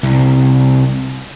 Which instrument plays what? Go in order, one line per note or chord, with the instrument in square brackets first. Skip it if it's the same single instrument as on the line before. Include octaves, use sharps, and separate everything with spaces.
[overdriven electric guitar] C2